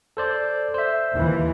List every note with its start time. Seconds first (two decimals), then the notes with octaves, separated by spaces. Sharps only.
0.17 A4 C5 D5
0.74 C5 E5
1.14 D#2 E3